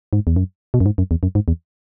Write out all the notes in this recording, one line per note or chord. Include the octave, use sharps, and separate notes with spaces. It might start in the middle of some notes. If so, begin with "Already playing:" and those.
G#2
E2
F#2
B2
F#2
G#2
F#2
E2
F#2
G#2
E2